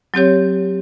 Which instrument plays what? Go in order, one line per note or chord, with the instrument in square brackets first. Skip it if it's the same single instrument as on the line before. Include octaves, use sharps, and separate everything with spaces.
[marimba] F#3 C4 G4 C#5